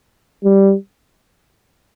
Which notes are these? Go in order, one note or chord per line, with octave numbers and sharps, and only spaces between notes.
G3